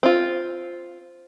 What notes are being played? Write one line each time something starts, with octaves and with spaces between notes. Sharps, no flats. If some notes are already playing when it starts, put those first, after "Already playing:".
C4 F4